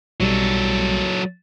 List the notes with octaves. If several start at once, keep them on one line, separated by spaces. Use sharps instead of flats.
B1 F#3 G3 A4